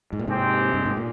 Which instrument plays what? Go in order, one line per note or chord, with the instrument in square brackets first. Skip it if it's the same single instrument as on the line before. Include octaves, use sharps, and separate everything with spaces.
[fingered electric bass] G#2
A#2
[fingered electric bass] G#2 C3 [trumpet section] G#3 C4 G4
[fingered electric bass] G2
G#2
A#2